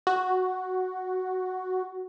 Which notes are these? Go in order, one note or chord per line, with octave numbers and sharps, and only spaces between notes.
F#4